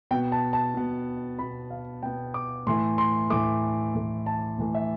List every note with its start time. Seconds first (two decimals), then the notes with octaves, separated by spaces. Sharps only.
0.11 B2 B3 G5
0.32 A5
0.53 A5
0.74 B2 B3
1.39 B2 B3 B5
1.70 F5
2.03 B2 B3 G5
2.34 D6
2.67 A2 E3 A3 C6
2.98 C6
3.30 A2 E3 A3 D6
3.95 A2 E3 A3
4.26 A5
4.58 A2 E3 A3
4.75 E5